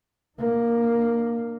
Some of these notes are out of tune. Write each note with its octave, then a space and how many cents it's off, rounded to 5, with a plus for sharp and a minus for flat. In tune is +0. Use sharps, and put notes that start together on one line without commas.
A#3 +0 D4 +40